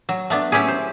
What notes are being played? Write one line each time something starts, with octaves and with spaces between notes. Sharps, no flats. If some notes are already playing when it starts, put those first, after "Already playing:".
F#3
A3 B3 D4
F#3 C#4 E4 G4 G#4
C5